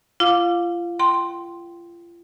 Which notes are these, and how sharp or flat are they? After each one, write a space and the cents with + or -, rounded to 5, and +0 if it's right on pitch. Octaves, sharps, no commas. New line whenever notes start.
F4 -35 F5 +15 D6 +0
G5 -15 C6 +0